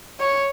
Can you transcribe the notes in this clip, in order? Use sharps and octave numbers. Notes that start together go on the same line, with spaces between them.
C#5